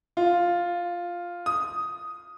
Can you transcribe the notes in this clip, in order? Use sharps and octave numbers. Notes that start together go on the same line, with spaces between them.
F4
D#6